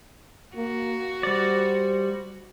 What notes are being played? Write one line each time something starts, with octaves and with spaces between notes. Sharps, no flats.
A#3 F#4
G3 C5 D5